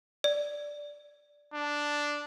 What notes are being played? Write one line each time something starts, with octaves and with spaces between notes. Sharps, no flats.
D5
D4